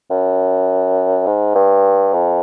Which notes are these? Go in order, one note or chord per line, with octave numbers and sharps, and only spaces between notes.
F#2
G#2
G2
F2